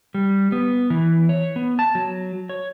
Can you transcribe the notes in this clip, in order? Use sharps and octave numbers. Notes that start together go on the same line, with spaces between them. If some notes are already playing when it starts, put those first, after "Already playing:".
G3
B3
E3
C#5
B3
A5
F#3
C#5